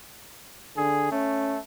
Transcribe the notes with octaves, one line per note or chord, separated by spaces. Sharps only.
D3 G#4
A3 C#4